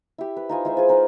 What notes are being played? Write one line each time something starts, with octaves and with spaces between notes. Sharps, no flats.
E4 G4
B4
D#4 F4 G#5 D#6
G#3 E4 G#4 C5
F4 G#4
D#4 F4 B4